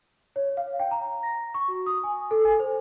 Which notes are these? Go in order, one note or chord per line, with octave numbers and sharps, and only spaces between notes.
C#5
F5
G5
A#5
A#6
C#6
F#4
D#6
G#5
A4
G#5
C5